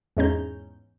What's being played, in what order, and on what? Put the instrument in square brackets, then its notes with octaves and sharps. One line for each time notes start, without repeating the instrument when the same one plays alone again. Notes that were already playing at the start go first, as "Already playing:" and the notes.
[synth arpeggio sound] E2 G#2 G#3 C#4 A#5 G6